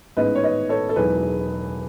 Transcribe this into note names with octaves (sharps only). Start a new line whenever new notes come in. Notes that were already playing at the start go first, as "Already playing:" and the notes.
A1 G#2 D#3 G#3 B3 B4 D#5
C#5
B4 D#5
A4 C#5
A4
E1 E2 D#3 F#3 G#4 B4